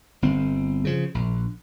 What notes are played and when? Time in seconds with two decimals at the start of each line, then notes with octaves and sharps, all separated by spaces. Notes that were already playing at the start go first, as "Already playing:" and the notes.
0.22 G1 C4
0.85 C#3 F3
1.15 A#1